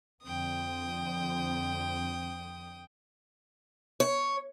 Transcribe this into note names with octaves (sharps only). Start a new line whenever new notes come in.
F2 D3 C4 G5 D#6
C#5